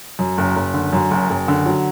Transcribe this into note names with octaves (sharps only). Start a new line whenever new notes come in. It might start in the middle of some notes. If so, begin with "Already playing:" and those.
F#2
F#1
F#1
D3
F#2
F#1
F#1
D3
F#3